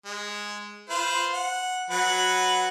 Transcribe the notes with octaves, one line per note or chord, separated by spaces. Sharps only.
G#3
F4 B4 C5
F#5
F#3 B4 F#5